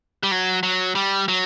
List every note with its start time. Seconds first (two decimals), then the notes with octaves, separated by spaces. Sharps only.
0.23 G3
0.31 F#3
0.63 F#3
0.95 G3
1.28 F#3